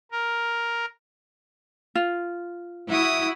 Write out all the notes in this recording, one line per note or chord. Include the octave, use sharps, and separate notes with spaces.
A#4
F4
E4 F#4 D#6